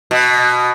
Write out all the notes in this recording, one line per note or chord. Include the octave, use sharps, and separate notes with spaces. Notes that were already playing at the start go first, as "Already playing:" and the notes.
B2